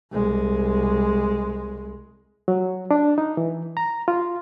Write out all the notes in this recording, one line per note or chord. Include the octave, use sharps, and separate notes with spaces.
C2 G#3
F#3
D4
D#4
E3
A#5
F4